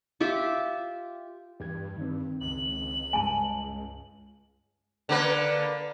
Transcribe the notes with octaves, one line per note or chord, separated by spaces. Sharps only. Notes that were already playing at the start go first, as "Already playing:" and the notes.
F4 G4 E5 D6
E2 G2 G4 G#6
D#3 C4
C#2 F#7
G2 G#3 G#5 A5
D3 A#3 B4